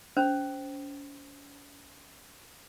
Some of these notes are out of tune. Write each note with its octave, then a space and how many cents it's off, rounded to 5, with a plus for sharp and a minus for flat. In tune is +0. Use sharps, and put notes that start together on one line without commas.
C#4 +40 C5 +0